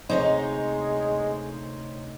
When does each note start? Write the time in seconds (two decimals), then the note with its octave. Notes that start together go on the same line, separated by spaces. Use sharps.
0.10 D2 C3 G#3 D#4 C5 C#5 D#5